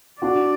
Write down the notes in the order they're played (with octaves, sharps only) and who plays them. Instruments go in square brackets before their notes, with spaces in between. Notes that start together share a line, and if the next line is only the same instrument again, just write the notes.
[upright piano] D4 F#4 [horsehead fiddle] D5